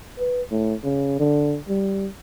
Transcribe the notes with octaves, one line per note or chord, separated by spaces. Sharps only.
B4
A2
C#3
D3
G3